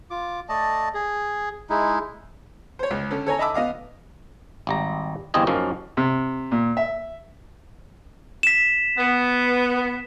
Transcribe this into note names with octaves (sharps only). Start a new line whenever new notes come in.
F4 D6
A3 D5 D#5 A5
G#4
G#3 D#4 E4
C5 C#5
C#2
D3 C#4
A4 C#5 G#5 A#5
D#5 E5 A5 B5 D6 E6
B3 D#5 F5 D6
G#1 G3 A#5
G1 E2 C4 G4 D#5 G#5
F#2 F3 A#3 C#4 D#4
C3
A#2
E5
B6 E7
B3